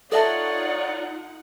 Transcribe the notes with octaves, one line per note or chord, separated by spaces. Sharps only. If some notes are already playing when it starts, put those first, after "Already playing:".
D#4 F4 A4 C#5 D5 E5 F#5 A5